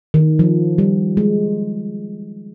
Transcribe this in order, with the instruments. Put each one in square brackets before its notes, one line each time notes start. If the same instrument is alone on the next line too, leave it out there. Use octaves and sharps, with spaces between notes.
[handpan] D#3
F3
G3
G#3